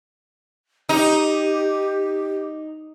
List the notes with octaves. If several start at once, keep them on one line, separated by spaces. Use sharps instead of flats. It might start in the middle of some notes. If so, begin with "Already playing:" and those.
D#4 G4